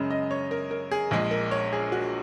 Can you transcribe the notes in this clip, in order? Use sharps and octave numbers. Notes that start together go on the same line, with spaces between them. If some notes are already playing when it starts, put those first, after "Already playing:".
Already playing: F#2 C#3 G#3
D#5
C#5
A#4
A#4
G#4
A#1 A#2 G#3 G#4
A#4
C#5
G#4
F#4